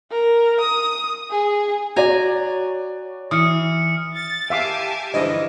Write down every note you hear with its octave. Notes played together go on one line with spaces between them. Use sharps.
A#4
D#6
G#4
F#4 C#5 D5 G#5 A#5
E3 D#6 F6 C#7
A6
G4 E5 F5 G#5 A5 D6
G2 D3 E3 F3 D#5